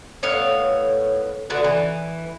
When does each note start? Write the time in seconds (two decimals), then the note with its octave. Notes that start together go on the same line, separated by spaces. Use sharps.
0.23 A2 B3 C#5 F5
1.50 D3 A3 B3 F#4
1.64 E3